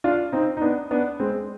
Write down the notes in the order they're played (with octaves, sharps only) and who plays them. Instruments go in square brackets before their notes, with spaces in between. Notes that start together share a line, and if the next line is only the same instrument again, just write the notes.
[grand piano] D4 F4
C4 D#4
D#4
B3 D4
B3 D4
G#3 C4